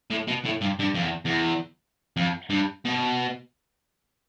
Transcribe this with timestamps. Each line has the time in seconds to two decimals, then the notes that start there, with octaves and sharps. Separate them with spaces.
0.11 A2
0.28 B2
0.45 A2
0.62 G2
0.80 G2
0.95 F2
1.02 E2
1.25 E2
2.17 F2
2.50 G2
2.85 B2